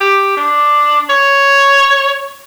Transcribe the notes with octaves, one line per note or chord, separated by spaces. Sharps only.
G4
D4
C#5